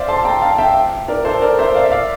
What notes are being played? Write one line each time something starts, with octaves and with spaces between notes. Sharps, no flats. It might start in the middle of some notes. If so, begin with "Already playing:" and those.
Already playing: C5 D5 E5 F5
A5 C6
G5 A#5
F5 A5
E5 G5
A#4 D5
A4 C5
A#4 D5
C5 E5
D5 F5
E5
D5 F5